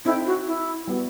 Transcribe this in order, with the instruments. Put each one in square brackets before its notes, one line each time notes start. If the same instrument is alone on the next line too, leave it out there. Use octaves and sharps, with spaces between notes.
[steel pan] C4 D#4 A4 E5 G5 [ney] E4
[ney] F#4
E4
[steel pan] G3 B3 F#4